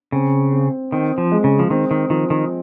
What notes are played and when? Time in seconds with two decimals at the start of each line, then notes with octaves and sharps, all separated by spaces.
0.12 C#3 C4
0.53 C4
0.92 D#3 C4
1.18 F3
1.32 G#3
1.44 C#3
1.59 F3
1.70 D#3 C4
1.91 D#3
2.10 D#3 F3
2.30 D#3